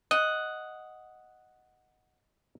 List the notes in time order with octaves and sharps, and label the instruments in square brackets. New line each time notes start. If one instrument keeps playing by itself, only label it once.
[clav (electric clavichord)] D#5 [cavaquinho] F#5